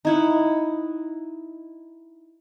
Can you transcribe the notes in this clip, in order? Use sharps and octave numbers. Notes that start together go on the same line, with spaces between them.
D#4 E4 F#5